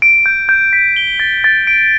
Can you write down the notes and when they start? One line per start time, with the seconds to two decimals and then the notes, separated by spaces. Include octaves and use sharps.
0.02 D7
0.26 G6
0.49 G6
0.73 B6
0.96 G7
1.20 A6
1.44 A6
1.67 D7